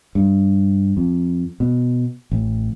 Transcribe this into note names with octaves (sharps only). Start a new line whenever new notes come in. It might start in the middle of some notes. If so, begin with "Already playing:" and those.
G2
F2
B2
A1